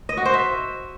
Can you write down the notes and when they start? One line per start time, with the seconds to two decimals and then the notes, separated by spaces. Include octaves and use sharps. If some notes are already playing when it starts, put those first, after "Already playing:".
0.09 D#5
0.17 F#4
0.25 C5
0.34 E5